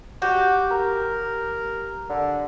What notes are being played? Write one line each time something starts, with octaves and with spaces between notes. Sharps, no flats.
F#4 G4
A#4
D3